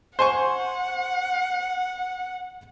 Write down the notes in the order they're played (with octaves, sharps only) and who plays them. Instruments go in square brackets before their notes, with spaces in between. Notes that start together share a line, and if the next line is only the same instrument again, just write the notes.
[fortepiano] C5 G#5 C#6 [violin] F#5